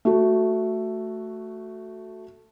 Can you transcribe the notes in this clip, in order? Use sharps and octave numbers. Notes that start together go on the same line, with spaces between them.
A3 F#4